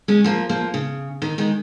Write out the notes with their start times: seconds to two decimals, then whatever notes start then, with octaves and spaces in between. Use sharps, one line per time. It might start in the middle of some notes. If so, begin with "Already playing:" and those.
0.08 G#3 C#4
0.24 F3 A#3
0.49 F3 A#3
0.74 C#3
1.22 D#3
1.38 D#3 G#3